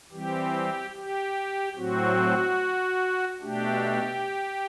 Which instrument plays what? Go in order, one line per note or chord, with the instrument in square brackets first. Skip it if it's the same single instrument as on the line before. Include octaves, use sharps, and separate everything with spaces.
[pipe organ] E3 G3 C4 G4
G4
A2 F#3 C4 F#4
B2 A3 D4 G4